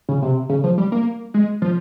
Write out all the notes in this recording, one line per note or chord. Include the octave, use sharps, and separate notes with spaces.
C#3
C3
C#3
F3
G3
A#3
G#3
F3